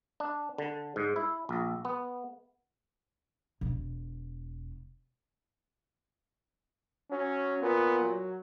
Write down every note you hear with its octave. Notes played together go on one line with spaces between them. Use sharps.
D4
D3
G#2
E4
A#1
B3
E1 B2
F#3 C#4
A#2 B3
F#3